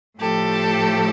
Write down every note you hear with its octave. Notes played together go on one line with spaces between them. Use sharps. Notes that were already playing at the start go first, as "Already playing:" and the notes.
A2 F3 A3 G4 A4